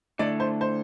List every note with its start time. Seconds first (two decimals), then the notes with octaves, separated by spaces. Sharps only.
0.19 D3 A3 E4 A4 D5
0.40 C5
0.61 C5